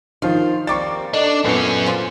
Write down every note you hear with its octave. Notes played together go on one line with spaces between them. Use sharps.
D#3 F3 F4
G3 A#3 C4 C#6 D6 A6
D4 A4 D5 D#5
F#2 A#2 B3 C#4
F4 C5